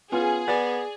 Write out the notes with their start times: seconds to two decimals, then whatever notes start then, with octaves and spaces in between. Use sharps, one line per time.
0.12 B3 C#4 F4 G#4
0.48 B3 D5 A6